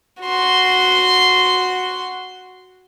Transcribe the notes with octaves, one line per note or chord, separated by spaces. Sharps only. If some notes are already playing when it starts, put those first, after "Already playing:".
F#4 C6